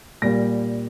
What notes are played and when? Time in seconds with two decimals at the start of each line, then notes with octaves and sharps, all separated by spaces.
0.22 A#2 G3 A#3 A#6